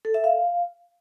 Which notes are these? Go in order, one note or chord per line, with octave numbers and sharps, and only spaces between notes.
A4
E5
F5